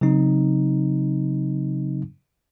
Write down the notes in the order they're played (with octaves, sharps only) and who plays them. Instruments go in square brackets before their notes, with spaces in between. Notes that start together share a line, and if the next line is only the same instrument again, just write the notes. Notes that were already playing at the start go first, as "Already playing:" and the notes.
[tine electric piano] C#3 F#3 C4 D#4